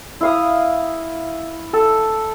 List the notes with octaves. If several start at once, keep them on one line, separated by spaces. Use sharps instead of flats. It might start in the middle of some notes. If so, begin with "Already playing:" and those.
E4 F5 D#6
A4